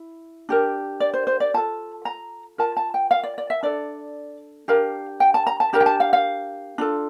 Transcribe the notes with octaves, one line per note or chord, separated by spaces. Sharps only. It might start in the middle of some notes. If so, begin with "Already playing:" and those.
Already playing: E4
D4 G4 A#4
D5
C5
C5
D5
F4 A4 A5
A#5
F4 A#4 A5
A5
G5
F5
D5
D5
E5
D4 A4 D5
D4 G4 A#4 F5
G5
A5
A#5
A5
D4 G4 A#4 A#5
G5
A5
F5
F5
D4 F4 A4